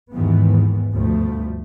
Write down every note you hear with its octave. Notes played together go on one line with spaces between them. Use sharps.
D#2 G#2 D#3 E3 B3
D2 G2 B2 F3 A3